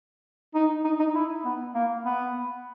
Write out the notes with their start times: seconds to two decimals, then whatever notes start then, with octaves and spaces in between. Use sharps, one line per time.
0.54 D#4
0.84 D#4
0.99 D#4
1.15 E4
1.45 B3
1.75 A#3
2.05 B3